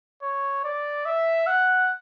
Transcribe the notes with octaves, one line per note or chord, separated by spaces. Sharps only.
C#5
D5
E5
F#5